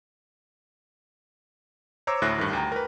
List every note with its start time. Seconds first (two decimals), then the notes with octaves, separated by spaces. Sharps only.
2.07 C5 C#5 A#5 D6 E6
2.22 D2 A2 E5 F#6 A#6
2.38 G2 D#3
2.53 D2 G5 A#5
2.72 A#4 B4